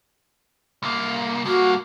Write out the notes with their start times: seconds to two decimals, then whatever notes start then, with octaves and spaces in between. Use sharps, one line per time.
0.82 C2 A#3
1.45 G2 A#3 F#4